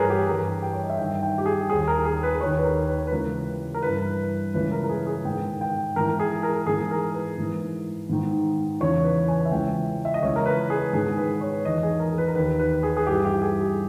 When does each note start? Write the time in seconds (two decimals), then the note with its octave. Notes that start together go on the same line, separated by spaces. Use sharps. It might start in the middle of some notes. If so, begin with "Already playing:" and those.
Already playing: G2 E3 G#4 A#4 B4 C#5
0.10 G4
0.27 G2 E3 A#4
0.62 G5
0.73 C#5
0.83 D#5
0.90 E5
0.98 G2 D#3 G5
1.23 G5
1.38 G4
1.46 G#4
1.70 D#2 D#3 G#4
1.88 A#4
2.05 G#4
2.23 B4
2.41 D#2 D#3 C#5
2.58 B4
2.64 A#4
2.88 B4
3.07 B4
3.12 C#2 C#3 E3 A#4
3.74 A#4
3.83 G2 E3 B4
4.54 C#2 C#3 E3 B4
4.72 A#4
4.84 A#4
4.89 G#4
5.07 G#4
5.25 G#2 D#3 G5
5.61 G5
5.96 G#2 E3 A#4
6.20 G#4
6.43 A#4
6.67 G#2 E3 G#4
6.91 A#4
7.14 B4
7.38 G#2 E3
8.09 G#2 D#3
8.80 E2 C#3 E3 C#5
9.04 B4
9.28 G#5
9.46 E5
9.51 C#2 C#3 E3 G5
10.05 E5
10.14 D#5
10.23 C#2 C#3 E3 C#5
10.36 A#4
10.46 B4
10.70 G#4
10.93 G#2 D#3 G#4
11.17 B4
11.41 C#5
11.65 E2 D#3 D#5
11.83 G#4
12.00 A#4
12.18 B4
12.27 A#4
12.35 D#2 D#3 B4
12.59 B4
12.83 G#4
12.97 G#4
13.07 G2 E3 G4
13.25 G4
13.42 G#4
13.61 G4